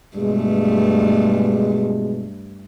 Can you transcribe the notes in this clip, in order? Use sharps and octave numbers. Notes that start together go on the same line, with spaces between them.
G2 B2 G#3 A3